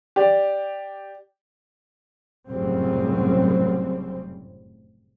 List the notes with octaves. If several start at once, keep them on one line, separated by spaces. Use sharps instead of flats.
G4 D5
F1 F#2 A2 C#3 G3 C4